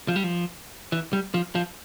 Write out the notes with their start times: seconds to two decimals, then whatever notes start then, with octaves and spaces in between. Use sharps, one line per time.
0.08 F3
0.16 G3
0.24 F3
0.92 E3
1.13 G3
1.34 F3
1.55 F3